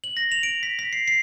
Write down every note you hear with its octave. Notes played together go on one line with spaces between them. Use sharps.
F#7
A#6
F7
D7
B6
B6
C7
C7